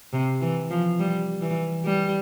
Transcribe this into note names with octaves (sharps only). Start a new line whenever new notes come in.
C3
E3
F3
G3
E3
G3